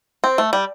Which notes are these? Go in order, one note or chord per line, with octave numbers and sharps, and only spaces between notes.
C4
A3
G3